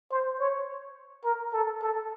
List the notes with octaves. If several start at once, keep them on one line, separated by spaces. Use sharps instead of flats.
C5
C#5
A#4
A4
A4